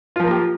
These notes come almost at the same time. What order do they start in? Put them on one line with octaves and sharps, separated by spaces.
F4 F3 A#4 A#3 G4